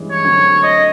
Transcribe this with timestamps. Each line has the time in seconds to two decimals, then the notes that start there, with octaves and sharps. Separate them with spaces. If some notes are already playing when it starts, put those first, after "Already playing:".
Already playing: G2 E3 G#3 C#4
0.11 C#5
0.24 D3 F#3 A3 C4
0.63 D#5